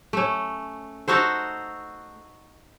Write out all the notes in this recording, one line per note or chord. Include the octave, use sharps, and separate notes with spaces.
A3 C#4
D#4 F#4 A4 C5